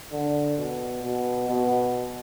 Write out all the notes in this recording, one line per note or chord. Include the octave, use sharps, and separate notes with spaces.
D3
B2
B2
B2